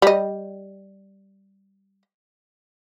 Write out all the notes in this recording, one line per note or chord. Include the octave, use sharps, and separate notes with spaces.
G3 D#5